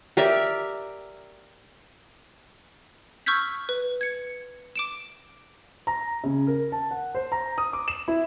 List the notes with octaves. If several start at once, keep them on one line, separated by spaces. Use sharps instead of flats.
G4 A#4 D5 E5
C#6 E6 F6 G6 G#6 B6
B4
G#6 C#7
D6 D7 E7
A#5
C#3
A#4
A5
F#5
C5
A#5
D#6
D6
E7
E4